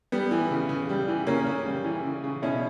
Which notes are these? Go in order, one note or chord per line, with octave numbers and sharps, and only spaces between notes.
G3 B3
E3
C#3
C#3
G3
E3
C#3 A#3 C#4
C#3
G3
E3
C#3
C#3
B2 C#4 E4